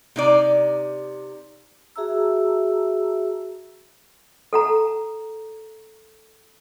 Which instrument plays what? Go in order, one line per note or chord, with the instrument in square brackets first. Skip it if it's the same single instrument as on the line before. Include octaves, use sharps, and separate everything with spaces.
[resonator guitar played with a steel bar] C3 D#4 D5
[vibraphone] F#4 G#4 E5 A5 A#5 E6
[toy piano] A4 F#5 A#5